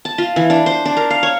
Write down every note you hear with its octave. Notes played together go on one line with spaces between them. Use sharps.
A5
F4
E3
D4
C5
D4
A#4
F5
C#5